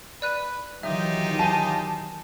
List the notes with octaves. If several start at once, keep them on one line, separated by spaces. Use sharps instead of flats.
B4 D5 F#6 D#7
D#3 E3 F#3 D#4 F4 G4 E5
F5 G#5 A5 D#7